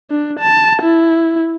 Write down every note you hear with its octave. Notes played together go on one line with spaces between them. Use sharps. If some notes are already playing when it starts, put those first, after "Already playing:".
D4
A5
E4